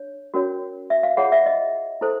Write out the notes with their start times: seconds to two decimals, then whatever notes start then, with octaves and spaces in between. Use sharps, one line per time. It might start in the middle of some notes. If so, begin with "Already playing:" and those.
Already playing: D4 C#5
0.34 C#4 F#4 A#4 C#5
0.90 E5
1.03 F5
1.17 F4 G#4 C#5 F#5
1.32 E5
1.46 D#5
2.01 E4 A4 C5